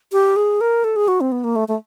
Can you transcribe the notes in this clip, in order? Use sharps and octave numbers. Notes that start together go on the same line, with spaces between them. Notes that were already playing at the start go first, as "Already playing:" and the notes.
G4
G#4
A#4
A4
G#4
F#4
C4
B3
A#3
A3
A3